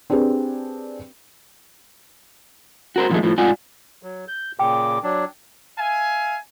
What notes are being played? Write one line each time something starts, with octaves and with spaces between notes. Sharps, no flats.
C4 D4 G4 G#4 B4
F#4 A#4 C5
A#2 D#3 F3 F#3 G#3 A3
A2 F3
G#2 F4 D5 F#5 G#5
F#3
G6
A#2 C#3 G5 D6
F#3 D4
E5 F5 G#5